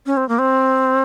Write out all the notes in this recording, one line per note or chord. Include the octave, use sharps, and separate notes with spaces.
C#4
C4
A#3
C4